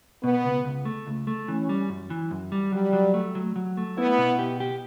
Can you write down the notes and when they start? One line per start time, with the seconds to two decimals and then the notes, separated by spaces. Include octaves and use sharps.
0.23 B2 B3
0.44 C#2
0.65 C#2
0.85 A3
1.07 C#2
1.27 A3
1.48 E3 C#4
1.69 G3
1.90 F#2
2.10 E3
2.31 F#2
2.52 G3
2.72 F#3 G3
2.93 F#3
3.14 A3
3.35 F#3
3.56 F#3
3.77 A3
3.97 B3 E4
4.18 B2
4.39 G4
4.60 G4